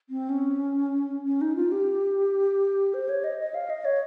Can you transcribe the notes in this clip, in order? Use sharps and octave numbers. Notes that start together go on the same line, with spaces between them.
C4
C#4
C#4
D#4
F4
G4
C5
C#5
D#5
D#5
F5
D#5
C#5